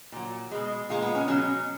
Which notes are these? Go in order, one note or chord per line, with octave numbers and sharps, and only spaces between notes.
A#2 F#3
B2 G#3
A#2 G#3 F4
B3
C#4
B2 F#3 C#4